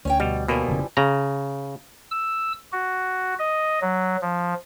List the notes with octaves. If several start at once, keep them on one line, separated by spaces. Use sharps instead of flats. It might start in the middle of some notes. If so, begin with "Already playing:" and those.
D2 C#4 C#5 G5
B2 G3
B2 E3 F3 G3 A#3
F1 C#3
C#3 A#5
E6
F#4
D#5
F#3
F3